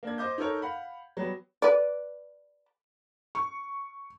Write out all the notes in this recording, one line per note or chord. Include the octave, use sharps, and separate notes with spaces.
A#3 D4 G#6
C5 D#5 D6 G6
D#4 A4 A#4 C#5
F5 F#5 B5
F#3 G3 B3
B4 D5
C#6